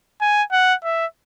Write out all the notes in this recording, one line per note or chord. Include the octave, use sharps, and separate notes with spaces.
G#5
F#5
E5